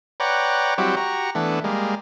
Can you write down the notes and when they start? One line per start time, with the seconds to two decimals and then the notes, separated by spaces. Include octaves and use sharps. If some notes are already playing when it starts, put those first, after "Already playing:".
0.20 B4 C#5 D5 F#5 G5 A#5
0.78 F#3 G3 C4 E4 F#4 G4
0.97 F#4 G4 A#5 C#6
1.35 E3 A3 B3 D4
1.64 G3 G#3 A#3